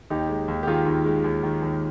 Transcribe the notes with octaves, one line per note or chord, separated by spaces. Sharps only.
D#2 D#4 G4
G#3
D#2
G4
D#3 F4 G#4
D#2
G#3
D#2
D#3
D#2